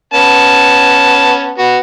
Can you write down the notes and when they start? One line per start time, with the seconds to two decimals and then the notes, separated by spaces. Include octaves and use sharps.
0.14 B3 C#4 A5
1.58 B3 F#4